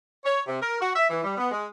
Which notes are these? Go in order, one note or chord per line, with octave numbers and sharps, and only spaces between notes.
C#5
C3
A#4
F#4
E5
E3
G3
B3
G#3